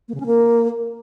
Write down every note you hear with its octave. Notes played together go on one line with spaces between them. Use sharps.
A#3
C#3
C#4
A#3